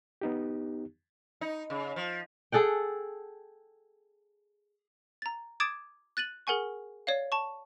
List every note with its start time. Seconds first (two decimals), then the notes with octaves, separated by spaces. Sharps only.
0.21 B3 D#4 G4
1.41 D#4
1.70 C#3
1.96 F3
2.52 G#4 A4 F#5 G5
5.22 A#5 A6
5.60 D6 D#6 G#6 A6 D7 E7
6.17 F#6 A6 D#7 F#7
6.47 G#4 A#4 F#5 G#5 C#6
7.07 C#5 D5 F5
7.32 A5 C#6